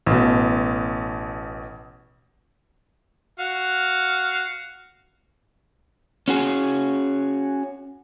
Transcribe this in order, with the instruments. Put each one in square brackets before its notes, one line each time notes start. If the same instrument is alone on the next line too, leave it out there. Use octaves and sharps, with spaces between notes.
[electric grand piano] A1 B2
[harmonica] F#4 F5
[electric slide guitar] C#4 F#4 G#4